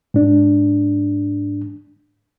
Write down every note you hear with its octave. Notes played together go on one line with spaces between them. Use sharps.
G#2 D4